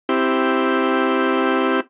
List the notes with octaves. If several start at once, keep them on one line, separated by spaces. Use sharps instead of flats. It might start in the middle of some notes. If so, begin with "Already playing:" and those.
C4 E4 G4